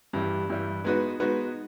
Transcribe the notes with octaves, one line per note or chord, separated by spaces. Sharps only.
G2 E3 G3
G2 E3 G3
G#3 B3 D#4 F#4 B4
G#3 B3 D#4 F#4 B4